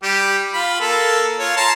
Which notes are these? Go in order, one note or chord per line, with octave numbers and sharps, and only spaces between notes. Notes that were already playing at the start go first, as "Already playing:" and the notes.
G3 G4
F4 B5
A#3 A4
F4 C#5
A5 A#5 C6